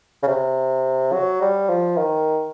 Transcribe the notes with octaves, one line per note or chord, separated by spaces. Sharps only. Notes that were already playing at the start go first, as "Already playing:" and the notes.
C#3
C3
F#3
G3
F3
D#3